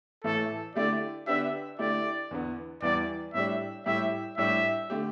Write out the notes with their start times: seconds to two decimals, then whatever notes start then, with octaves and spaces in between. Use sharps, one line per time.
0.24 A2 E3 A3 E4 A4
0.75 D3 A3 E4 G4 D5
1.27 D3 B3 D4 G4 E5
1.79 D3 A3 E4 G4 D5
2.31 E2 D3 B3
2.82 E2 E3 G3 D5
3.34 A2 G3 D4 G4 E5
3.86 A2 G3 E4 G4 E5
4.38 A2 G3 D4 G4 E5
4.90 D3 A3 G4